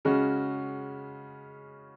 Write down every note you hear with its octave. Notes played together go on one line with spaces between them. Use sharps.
C#3 G#3 C#4 F#4